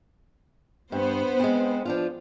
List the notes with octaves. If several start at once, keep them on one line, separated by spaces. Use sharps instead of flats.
G2 B3 C5
G#3 C4
F3 D4 F4